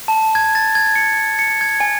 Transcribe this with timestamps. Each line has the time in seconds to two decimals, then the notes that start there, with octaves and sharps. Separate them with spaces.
0.08 A5
0.35 G#6
0.55 A6
0.75 G#6
0.96 C#7
1.39 C#7
1.61 G#6
1.80 G#5